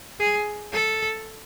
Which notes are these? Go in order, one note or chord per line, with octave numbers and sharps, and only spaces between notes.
G#4
A4